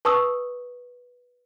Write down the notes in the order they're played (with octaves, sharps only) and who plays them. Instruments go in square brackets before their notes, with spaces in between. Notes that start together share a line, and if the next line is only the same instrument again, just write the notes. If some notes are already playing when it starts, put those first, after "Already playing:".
[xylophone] B4 A5 C#6 D#6 E6